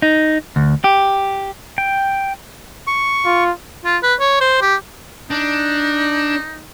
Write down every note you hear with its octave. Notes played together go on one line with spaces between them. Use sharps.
D#4
D2
G4
G5
C#6
F4
F4
B4
C#5
C5
G4
D4 D#4